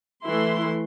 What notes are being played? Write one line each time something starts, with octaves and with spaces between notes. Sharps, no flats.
E3 A3 E4 C6